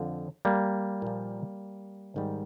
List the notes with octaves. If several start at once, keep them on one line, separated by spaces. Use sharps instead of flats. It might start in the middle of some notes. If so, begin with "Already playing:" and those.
Already playing: F2 D3 F3
G3 A#3
A#2 F3
G#2 D#3 G3